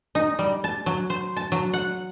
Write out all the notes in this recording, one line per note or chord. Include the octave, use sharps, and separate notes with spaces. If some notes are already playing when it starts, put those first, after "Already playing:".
D#4
G3
A5
F#3
C5
A5
F#3
F#5